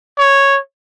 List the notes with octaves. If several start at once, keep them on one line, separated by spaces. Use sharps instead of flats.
C#5